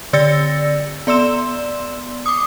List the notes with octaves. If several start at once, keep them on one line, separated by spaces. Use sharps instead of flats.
D3 D5 E6 A6 A#6 C#7
B3 D5 C6 E6 E7
D6 D#6